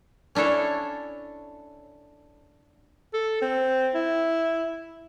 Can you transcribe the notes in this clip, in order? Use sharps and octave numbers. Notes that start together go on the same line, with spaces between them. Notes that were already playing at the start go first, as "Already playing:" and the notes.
C#4 D4 E4 A4 C#5
A4
C4
E4